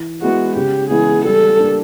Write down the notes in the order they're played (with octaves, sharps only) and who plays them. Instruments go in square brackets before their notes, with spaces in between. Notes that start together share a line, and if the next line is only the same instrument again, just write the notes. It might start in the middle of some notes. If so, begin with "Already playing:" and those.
Already playing: [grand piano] E3
[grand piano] G#3 B3 E4 G#4 [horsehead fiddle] F#4
[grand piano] C#3 [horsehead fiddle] G4
[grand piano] E3 G#3 B3 E4 [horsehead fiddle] G#4
[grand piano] G3 [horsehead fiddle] A4
[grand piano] A#3 D4